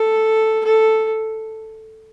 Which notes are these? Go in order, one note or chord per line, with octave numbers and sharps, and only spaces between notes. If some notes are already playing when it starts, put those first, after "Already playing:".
Already playing: A4
A4